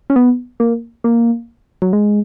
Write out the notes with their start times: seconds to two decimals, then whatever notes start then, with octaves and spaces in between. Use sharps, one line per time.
0.10 C#4
0.16 B3
0.60 A#3
1.04 A#3
1.82 F#3
1.93 G#3